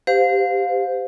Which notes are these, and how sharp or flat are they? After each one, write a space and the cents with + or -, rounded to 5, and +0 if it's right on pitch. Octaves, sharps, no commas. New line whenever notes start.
G4 +5 C5 -25 F5 +20